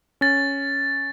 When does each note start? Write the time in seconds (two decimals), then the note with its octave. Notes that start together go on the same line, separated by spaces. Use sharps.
0.21 C#4 A6